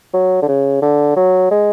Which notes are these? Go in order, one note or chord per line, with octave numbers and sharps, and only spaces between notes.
F#3
D3
C#3
D3
F#3
G#3